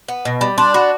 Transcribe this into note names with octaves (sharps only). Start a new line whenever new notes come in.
B3
B2
G3 B5
D4 C6
F#4 B5